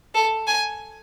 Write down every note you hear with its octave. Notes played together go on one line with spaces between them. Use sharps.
A4
G#5